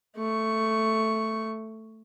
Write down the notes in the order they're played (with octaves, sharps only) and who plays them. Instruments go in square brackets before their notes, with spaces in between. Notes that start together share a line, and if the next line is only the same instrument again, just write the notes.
[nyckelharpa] A3 C#6